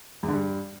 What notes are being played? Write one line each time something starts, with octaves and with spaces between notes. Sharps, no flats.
E2
D3
G2